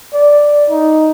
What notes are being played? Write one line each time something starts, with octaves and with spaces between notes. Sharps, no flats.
D5
D#4